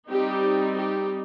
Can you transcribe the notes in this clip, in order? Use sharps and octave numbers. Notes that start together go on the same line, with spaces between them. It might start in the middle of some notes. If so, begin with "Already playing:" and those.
G3 C4 D#4 G4
G4